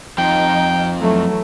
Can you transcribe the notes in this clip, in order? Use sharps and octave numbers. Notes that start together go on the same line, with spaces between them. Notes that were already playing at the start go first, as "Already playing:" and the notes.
F2 F3 D#4 G5
E3 F#3 A3